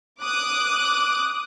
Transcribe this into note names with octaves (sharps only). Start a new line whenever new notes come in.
D6 D#6 F#6